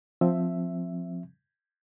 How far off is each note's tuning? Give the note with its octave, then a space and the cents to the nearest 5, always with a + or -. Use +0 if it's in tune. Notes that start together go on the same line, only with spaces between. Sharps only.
F3 +10 C4 +0 E5 +5